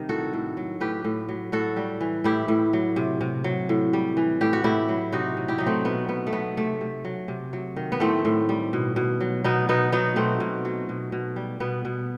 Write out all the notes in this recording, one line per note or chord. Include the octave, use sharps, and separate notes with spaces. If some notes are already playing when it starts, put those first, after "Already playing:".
Already playing: C3 D#3 G3 D#4
A2 F#4 A4
A2
F#3
A2 G4 B4
A2
F#3
A2 F#4 A4
G3
E3
A2 E4 G4
A2
F#3
C3
C3
F#3
A2
G3
E3
A2 G4
F#4
A2 E4 G4
F#3
C3 D#4 F#4
C3
E4 G4
F#3 D#4
A3 C4
B2 B3
B2 B3
A3
F#3 B3
C3 A3
C3
F#3
C3
F#3
D#3
B3
A2 A3 C4
A2
G3
B2
B2
F#3
B2 B3 D#4
B2 B3 D#4
F#3 B3 D#4
B2 A3 C4
B2
F#3
B2
B2
G3
B2 B3
B2